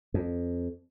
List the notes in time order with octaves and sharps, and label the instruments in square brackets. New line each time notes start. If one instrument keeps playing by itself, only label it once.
[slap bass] F2